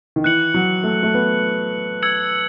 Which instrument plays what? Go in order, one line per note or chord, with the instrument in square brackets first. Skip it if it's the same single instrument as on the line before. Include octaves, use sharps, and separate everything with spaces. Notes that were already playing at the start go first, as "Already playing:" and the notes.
[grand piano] D#3
[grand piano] E3 [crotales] F#6 C#7 F#7
[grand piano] F#3
A3
A3
B3
[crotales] E6 G#6 C#7 F#7